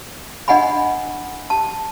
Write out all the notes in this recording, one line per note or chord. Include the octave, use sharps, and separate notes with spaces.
D4 D#5 F#5 G#5 B5
A5